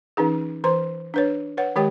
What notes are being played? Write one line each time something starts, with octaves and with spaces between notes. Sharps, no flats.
E3 C#4 D#4 G#4
E3 C5 C6
D4 B4 C#5
B4 C#5 F#5
D#3 G#3 G4 C#5 G5